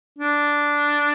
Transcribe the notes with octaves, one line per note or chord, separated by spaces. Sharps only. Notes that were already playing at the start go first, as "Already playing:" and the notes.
D4